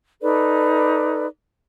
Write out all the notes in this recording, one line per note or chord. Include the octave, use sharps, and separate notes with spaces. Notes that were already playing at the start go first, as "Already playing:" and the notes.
D#4 A4 B4 D5